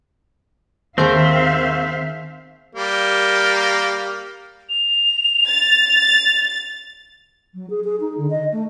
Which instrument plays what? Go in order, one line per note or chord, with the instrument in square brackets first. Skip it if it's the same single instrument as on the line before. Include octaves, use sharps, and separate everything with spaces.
[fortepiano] D#2 [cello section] D#3 E5 F5 [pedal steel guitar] C4 [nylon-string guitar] G#4 A#4 C5
[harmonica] G3 A#3
[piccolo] F7
[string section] A6
[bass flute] F#3
G#4
G#4
D#4
D3
D#5
A3